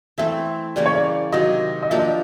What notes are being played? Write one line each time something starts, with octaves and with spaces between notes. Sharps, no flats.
E3 A3 C4 E5
C#3 E3 G3 A#3 D5
C#5
D5
C3 D#3 F#3 D#5
D#5
F3 A#3 D4 G4 E5
D#5